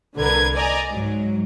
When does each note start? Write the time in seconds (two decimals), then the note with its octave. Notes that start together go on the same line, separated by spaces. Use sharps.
0.17 C2 D3 A#4 B4 G#6
0.54 D5 D#5 G#5 A#5
0.90 G#2 F#3